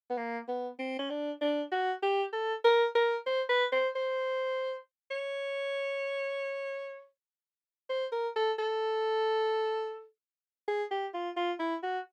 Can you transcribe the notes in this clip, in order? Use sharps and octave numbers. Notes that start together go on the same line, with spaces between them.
B3
A#3
B3
C4
C#4
D4
D4
F#4
G4
A4
A#4
A#4
C5
B4
C5
C5
C#5
C5
A#4
A4
A4
G#4
G4
F4
F4
E4
F#4